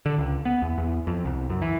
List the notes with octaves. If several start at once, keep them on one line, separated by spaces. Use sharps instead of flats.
D3
C#2
B3
E2
E2
F2
C2
F#2
E3